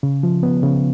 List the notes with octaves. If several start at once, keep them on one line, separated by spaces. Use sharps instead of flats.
C#3
F3
B3
C#3